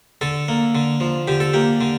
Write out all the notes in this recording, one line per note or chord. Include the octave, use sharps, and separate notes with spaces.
D3 A4
A#3
D3
F3
D3 G4
A4
A#3 G4
D3